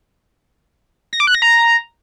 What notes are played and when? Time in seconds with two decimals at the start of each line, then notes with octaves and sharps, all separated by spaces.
1.13 A#6
1.20 D6
1.27 F#6
1.35 A#6
1.42 A#5